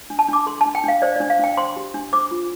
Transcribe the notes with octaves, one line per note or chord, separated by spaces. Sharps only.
D4
A5
D4 D6
A4 C6
D4 A5
G5
D4 F5
C5 D5
D4 D5
F5
D4 G5
C5 C6
G4
D4
C5 D6
F4